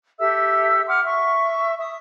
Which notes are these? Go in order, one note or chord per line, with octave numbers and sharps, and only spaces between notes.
G4 A4 E5 E6
F#5 C6 D6 F6
E5 C#6
E5 D#6